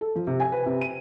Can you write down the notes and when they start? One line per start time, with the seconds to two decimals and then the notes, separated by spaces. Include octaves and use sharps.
0.01 A4
0.15 F3
0.27 C3
0.40 G#5
0.52 B4
0.66 C3
0.81 D#7